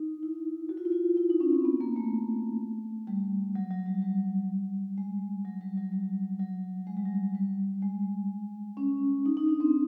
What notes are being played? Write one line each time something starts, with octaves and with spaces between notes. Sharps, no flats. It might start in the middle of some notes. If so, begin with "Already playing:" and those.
Already playing: D#4
E4
F#4
F4
E4
F4
E4
D#4
C#4
C4
B3
A#3
A3
G3
F#3
F#3
G3
G3
G#3
F#3
G3
F#3
G3
F#3
G#3
G3
F#3
G3
G3
G#3
C#4
D#4
D#4
D4
C4